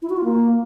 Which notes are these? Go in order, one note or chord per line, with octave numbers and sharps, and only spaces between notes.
E4
F#4
F4
A#3